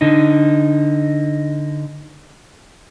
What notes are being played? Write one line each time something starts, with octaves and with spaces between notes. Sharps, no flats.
D3 D#4